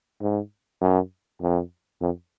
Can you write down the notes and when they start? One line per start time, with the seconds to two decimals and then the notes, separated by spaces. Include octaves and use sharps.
0.21 G#2
0.81 F#2
1.41 F2
2.01 F2